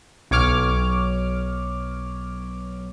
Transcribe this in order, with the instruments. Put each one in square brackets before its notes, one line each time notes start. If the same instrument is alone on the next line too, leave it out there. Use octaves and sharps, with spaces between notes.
[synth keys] B1 C#5 D6 F6